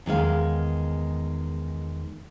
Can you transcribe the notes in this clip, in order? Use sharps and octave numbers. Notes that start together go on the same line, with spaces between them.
E2 D#3 G#3 F5